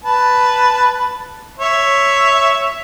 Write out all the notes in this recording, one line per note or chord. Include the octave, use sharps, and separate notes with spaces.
B4 A5
C#5 E5